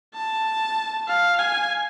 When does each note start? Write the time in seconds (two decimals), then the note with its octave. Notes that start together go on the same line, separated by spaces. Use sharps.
0.15 A5
1.08 F5
1.39 G#5